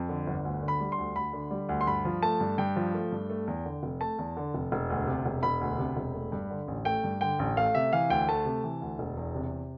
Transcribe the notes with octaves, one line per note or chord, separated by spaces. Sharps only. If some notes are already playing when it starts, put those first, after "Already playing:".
Already playing: F2
D3
G1
D2
D3
B5
G3
C6
D2
D2 B5
D3
G3
D2
C6
G2 B5
F3
A3 A5
G2
G2 G5
F3
A3
G2
A3
E2
D3
F1
A3 A5
E2
D3
F1
E1
D2
C3
E1
E1 B5
D2
C3
E1
A3
G2
D3
A1
A3 G5
G2
D3 G5
A1
A3 F5
C3 E5
E3 F5
D2 G5
A3 A5
C3
E3
D2
E1
E2
C3